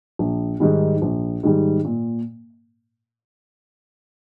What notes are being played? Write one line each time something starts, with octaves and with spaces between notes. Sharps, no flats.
A#1
G#2 D#3 G3
A#1
G#2 D#3 G3
A#2